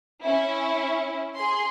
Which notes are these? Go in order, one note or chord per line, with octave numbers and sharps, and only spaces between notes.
C#4 E4
G#4 C6